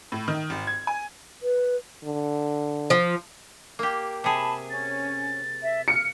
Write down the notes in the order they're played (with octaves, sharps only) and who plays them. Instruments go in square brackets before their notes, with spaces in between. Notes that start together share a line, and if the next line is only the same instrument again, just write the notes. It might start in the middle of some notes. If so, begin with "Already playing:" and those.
[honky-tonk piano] A2
D#3
G#1
G#6
G#5
[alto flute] B4
[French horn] D3
[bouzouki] F3
[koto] A#3 G4
[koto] C3 G#4 [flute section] A5 B5
[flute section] C#4 [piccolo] A6
[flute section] E5
[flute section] F6 [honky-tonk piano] C#7